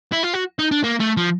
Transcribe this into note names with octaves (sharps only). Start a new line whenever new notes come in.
E4
F4
F#4
D#4
D4
A#3
A3
F3